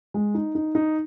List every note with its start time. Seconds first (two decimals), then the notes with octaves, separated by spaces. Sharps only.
0.14 G#3
0.34 D#4
0.55 D#4
0.75 D#4